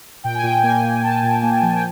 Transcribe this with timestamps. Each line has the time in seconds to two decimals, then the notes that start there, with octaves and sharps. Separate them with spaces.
0.24 A#2 G5
0.35 G#5
0.43 A#2 G5
0.63 A#3 G#5
0.84 A#2
1.03 A#3 A5
1.23 A#2
1.43 A#3
1.62 F3
1.73 G5